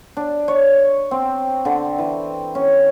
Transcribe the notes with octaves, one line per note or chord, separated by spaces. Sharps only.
D4
C#5
C4
D3
E3
C#4